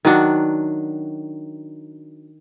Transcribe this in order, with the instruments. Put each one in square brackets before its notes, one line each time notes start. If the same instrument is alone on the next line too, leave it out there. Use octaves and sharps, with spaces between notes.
[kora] D#3 F#3 D4 F#4